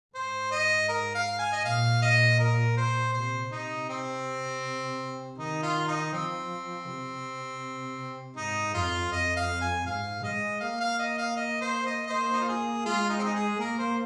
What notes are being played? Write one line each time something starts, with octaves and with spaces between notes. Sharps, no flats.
G#2 C5
D#5
A#4
F5
G#5
D#5
A#2 F5
D#5
A#4
C5
C3 C5
C3 D#4
C4
D#3 D#4
F4
D#4
F3 C4
C3
G#2 D#4
F2 F4
F2 D#5
F5
G#5
G#2 F5
G#3 D#5
A#3 F5
F5
D#5
F5
D#5
C5
D#5
D#5
A#3 C5
D#4
F4
G#4
G#3 F4
D#4
C4
D#4
G#4
A#3 A#4
C5